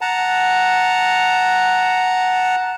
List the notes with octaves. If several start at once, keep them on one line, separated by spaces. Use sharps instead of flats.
F#5 A5 A#5